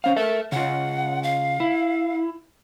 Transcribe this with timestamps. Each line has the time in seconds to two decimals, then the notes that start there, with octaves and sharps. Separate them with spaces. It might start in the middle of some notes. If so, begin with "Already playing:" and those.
0.04 C#4 C5 F5
0.16 A4 A#4 E5
0.52 C#3 F4 F#5
1.23 F5
1.60 E4